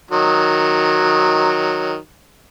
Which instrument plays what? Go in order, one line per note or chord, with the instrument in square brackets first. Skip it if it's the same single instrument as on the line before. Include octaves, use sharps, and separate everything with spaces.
[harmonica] D#3 F#3